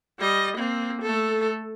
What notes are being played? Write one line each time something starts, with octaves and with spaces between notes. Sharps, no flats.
G3 D#5
A#3 C4
A3 A4